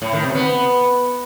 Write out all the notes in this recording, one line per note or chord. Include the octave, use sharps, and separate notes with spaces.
A2
D#3
C3
B3